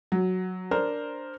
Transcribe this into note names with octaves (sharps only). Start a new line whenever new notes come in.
F#3
D4 A#4 C5